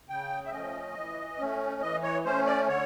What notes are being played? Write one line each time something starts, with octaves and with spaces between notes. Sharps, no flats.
C#3 G5
E5
F3 A3 C#4 D#5
E3
A3 C#4
E3 D#5
C#5
A3 C#4 C5
D5
D3 C#5